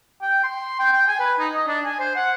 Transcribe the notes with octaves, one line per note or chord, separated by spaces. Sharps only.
G5
C6
G5
G5
G#5
B4
D#4
D#5
D4
G#5
C5
F#5